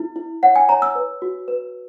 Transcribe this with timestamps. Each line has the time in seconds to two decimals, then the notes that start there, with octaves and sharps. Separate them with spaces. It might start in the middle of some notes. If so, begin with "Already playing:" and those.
Already playing: E4
0.16 E4
0.43 C#5 F#5
0.56 G#5
0.69 C#5 A#5
0.82 E6
0.95 B4
1.22 F#4
1.48 B4